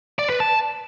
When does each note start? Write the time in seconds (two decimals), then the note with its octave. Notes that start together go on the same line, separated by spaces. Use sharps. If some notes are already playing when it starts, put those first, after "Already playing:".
0.19 D5
0.30 B4
0.40 A5